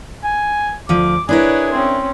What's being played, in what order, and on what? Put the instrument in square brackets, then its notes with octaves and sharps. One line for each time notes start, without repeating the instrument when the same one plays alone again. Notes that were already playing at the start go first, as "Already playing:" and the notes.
[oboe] G#5
[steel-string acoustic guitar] D2 F3 [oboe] D6
[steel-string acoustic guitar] D4 E4 A#4 [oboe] G#4 [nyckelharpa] B4 C#5
[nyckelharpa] C4 C#4